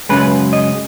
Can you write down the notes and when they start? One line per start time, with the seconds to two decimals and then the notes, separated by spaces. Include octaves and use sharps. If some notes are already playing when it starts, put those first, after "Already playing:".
0.09 F#2 C#3 G#3 B4
0.53 D#5